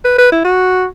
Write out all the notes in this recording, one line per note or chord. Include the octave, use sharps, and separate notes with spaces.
B4
B4
E4
F#4